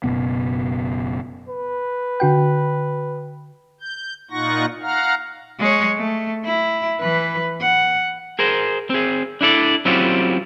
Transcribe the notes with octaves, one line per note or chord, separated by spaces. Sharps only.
F#1 D#2 B2 B3
B4
D3 F#4 G5
G6
A#2 D#4 F4 F#5 C#6 A#6
F5 F#5 A#5 F6
G#3 C#5
A3
E4
E3 B4
F#5
G#4 A#4 C5
C4 G#4
D4 E4 A4 D5
F#3 C4 C#4 E4 F4 G4